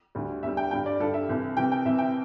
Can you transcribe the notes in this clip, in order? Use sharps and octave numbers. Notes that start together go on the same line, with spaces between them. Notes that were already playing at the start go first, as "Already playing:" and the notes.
D2 D3 G3
E2 D3 G3 E5
G5
G2 D3 G3 G5
D5
G2 D3 G3 A4
E5
C2 C3 E3
C2 C3 E3 G5
G5
C2 C3 E3 E5
G5